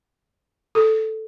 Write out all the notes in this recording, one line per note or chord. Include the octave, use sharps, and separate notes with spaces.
A4